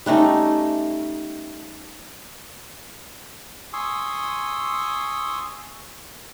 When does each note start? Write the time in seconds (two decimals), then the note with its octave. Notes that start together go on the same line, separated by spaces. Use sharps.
0.06 G3 A3 C#4 D#4
3.73 G#5 C6 C#6 D#6 E6